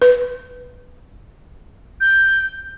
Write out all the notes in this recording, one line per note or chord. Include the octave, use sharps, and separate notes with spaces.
B4
G6